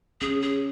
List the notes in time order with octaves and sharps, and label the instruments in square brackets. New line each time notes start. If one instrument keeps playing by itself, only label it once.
[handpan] C#4 [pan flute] G#4
[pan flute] G#4